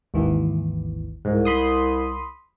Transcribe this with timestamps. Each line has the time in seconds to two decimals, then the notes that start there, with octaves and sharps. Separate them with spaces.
0.14 G#1 D#2 E3
1.25 C2 G#2
1.45 B5 C6 D#6